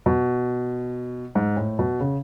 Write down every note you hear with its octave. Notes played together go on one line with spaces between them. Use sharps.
B2
G#2
A2
B2
C#3